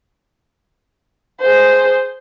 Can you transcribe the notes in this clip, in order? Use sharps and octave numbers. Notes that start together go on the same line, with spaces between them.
G#4 C5